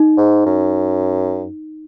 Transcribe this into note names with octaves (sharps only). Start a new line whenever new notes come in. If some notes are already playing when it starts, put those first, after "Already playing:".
Already playing: D#4
G#2
F#2